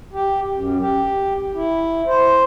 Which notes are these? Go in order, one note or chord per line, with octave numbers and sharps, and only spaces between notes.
G4
F#2
G4
E4
C5